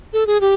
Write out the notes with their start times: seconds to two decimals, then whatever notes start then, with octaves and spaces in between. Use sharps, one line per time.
0.13 A4
0.27 G#4
0.41 G4